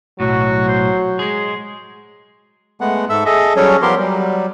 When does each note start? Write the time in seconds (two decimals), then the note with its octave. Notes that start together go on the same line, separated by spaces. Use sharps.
0.20 B1 A2 F#3 F#4
0.68 C5
1.19 G#3 G#4 C6
2.81 G#3 A3 B3 F#5
3.10 G#2 A4 E5 E6
3.26 G#4 A4 D#5 E5
3.56 F#3 G3 C#4 G#4 A4 C#5
3.82 F3 B3 G4 A#4 C6
3.99 F#3 G3